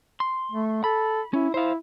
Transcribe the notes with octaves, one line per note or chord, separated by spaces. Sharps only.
C6
A3
A4 B5
C#4 E4
E4 C5 F5